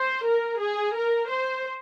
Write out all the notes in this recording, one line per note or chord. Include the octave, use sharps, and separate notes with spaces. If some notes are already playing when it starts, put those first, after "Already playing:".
Already playing: C5
A#4
G#4
A#4
C5